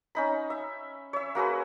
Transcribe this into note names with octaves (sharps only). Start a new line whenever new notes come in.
C#4 D#4 B5
E5
C#5 E5
A#3 F#4 G#4 B4